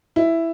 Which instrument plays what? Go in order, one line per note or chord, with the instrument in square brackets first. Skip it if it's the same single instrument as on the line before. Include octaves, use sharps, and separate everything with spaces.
[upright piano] E4